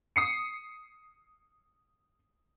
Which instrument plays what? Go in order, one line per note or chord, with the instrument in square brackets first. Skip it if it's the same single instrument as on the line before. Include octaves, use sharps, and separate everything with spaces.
[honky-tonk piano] D#6 C7 C#7